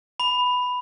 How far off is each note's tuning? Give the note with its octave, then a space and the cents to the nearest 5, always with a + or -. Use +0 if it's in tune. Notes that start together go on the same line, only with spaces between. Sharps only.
B5 +5